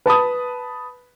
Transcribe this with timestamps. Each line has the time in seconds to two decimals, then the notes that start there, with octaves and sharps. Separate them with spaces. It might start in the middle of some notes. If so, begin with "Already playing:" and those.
0.06 B4 A5 B5 D#6